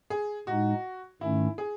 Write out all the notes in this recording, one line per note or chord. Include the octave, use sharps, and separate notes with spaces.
G#4
A2 G#3 D#4 F#4
G#2 D#3 A3 C#4 E4
G#4